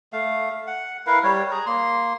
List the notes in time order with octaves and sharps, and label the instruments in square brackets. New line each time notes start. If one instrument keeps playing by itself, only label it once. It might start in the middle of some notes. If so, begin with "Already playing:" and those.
[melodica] A3 F5
F#5
E4 A#4 B4 F5
G3 C#5
G#4 A#5
A#3 C6